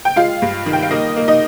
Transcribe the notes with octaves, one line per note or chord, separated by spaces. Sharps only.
G5
G#3 F4 F5
G2
D#3
G5
F5
A#3 D#4 D#5
A#3
D#4 D#5